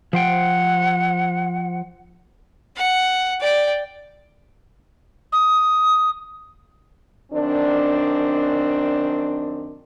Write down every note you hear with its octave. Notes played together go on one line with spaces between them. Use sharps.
F3 C5 F#5 G5
F#5
D5 G5
D#6
F#2 D#3 C4 D4